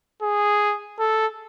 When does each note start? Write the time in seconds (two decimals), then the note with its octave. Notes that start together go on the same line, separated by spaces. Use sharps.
0.22 G#4
0.99 A4